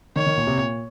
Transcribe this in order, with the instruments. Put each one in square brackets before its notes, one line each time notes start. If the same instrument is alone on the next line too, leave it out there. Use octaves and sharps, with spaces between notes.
[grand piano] D#3 [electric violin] C#5
[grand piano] D#3
A#2
C3
A#2